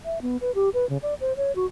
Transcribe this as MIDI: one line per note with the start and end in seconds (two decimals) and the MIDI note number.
0.05 0.22 76
0.22 0.37 59
0.41 0.54 71
0.55 0.69 67
0.74 0.88 71
0.89 0.97 49
1.03 1.14 74
1.21 1.36 72
1.37 1.54 73
1.56 1.66 66